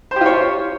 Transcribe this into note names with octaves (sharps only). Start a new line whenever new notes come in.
F4 G4 C5 C#5